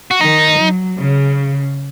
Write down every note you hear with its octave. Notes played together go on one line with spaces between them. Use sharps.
F#4
D#3 D#4
F#3
C#3